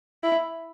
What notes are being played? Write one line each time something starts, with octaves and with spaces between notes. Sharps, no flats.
E4